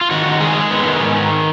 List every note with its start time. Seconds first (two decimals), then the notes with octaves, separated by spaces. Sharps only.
0.01 F4
0.10 D#3 F#4
0.26 D#3
0.40 G#3 G#4
0.55 G#3
0.71 B3
0.85 D#3
1.01 G#2
1.15 D#3